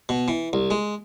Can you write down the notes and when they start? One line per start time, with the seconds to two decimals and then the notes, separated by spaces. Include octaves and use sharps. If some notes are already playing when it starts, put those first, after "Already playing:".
0.09 B2
0.28 E3
0.53 C2
0.71 G#3